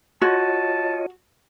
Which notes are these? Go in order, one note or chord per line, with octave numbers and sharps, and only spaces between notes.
F4 F#4 C#5 D#5 A5